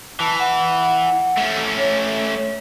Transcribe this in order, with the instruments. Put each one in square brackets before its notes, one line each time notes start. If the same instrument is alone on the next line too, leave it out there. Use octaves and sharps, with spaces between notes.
[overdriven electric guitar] E3 [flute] A5
[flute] F#5
[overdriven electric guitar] A3 C#4
[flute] C#5